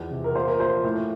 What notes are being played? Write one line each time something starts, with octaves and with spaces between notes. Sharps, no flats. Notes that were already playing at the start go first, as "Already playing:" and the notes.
Already playing: E2 F3
C3
A#4
A#2 C5
A#4
F3 C5
A2